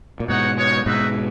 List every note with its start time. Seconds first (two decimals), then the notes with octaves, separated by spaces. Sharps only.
0.20 A#2
0.29 G#2 B2 D#4 F#4 C#5 F#5
0.57 G#3 D#4 F#4 C#5
0.86 G#2 B2 D#4 F#4 B4 E5